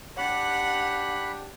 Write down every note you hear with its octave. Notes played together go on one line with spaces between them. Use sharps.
D4 G4 F#5 B5 F#6